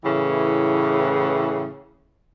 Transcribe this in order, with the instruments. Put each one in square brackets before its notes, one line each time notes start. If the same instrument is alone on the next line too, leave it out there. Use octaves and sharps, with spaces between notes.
[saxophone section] A2 C#3 E3